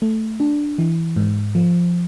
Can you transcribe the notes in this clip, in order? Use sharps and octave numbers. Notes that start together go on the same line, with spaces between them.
A3
D4
E3
G#2
F3